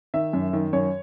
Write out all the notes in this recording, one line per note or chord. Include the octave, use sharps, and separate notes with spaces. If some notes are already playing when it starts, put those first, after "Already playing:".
D#3 E5
F#2
D#3
F#2 C#5